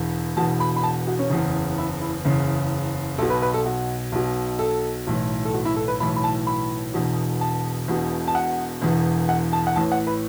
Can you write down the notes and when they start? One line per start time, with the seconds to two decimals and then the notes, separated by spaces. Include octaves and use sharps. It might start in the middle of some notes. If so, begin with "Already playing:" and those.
Already playing: E1 E2 E3
0.37 E1 E2 B2 A5
0.60 B5
0.76 B5
0.83 A5
1.07 F#4
1.19 C#4
1.30 F#1 E2 C#3
1.78 E4
2.01 E4
2.24 F#1 E2 C#3
3.18 B1 B2 A4
3.30 B4
3.42 B4
3.54 A4
3.66 F#4
4.12 B1 B2
4.59 A4
5.07 B1 A2 E3
5.45 A4
5.54 F#4
5.65 E4
5.76 A4
5.88 B4
6.00 B1 A2 E3 B5
6.16 B5
6.24 A5
6.47 B5
6.94 E1 E2 B2
7.41 A5
7.88 E1 E2 B2
8.28 A5
8.35 F#5
8.82 E1 E2 E3
9.29 F#5
9.53 A5
9.67 F#5
9.76 A1 A2 E3 A5
9.92 F#5
10.07 B4